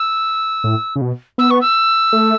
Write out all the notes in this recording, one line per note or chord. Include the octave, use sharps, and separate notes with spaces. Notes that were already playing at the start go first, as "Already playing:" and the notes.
Already playing: E6
A2
C#3
B2
B3 E6
C#6
E6
A3